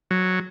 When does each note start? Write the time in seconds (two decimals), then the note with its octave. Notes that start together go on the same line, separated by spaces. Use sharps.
0.11 F#3